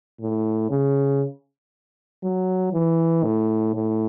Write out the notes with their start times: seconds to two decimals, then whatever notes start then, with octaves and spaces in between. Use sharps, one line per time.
0.21 A2
0.71 C#3
2.23 F#3
2.73 E3
3.23 A2
3.75 A2